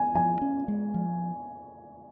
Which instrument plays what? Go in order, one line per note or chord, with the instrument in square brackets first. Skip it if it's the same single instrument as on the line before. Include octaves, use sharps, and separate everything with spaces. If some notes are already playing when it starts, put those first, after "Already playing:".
Already playing: [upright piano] G#5
[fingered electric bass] F3 [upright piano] G#5
[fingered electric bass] C#4
G#3
F3